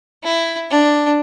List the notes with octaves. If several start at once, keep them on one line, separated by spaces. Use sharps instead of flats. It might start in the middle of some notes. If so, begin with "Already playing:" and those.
E4
D4